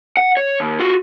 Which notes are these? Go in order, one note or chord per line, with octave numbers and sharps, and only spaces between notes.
F#5
C#5
D#2
F4 F#4